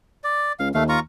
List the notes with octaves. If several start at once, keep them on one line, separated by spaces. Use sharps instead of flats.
D5
C#2 F5
D#2 A3 F5
F4 A#5 C#6